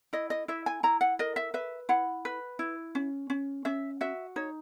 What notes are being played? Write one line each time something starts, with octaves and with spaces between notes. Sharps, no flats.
E4 D#5
D#5
E4 E5
G#5
E4 A#5
F#5
A#4 D#5
E5
B4 E5
E4 F#5
B4
E4
C#4
C#4
C#4 E5
F#4 E5
D#4 C#5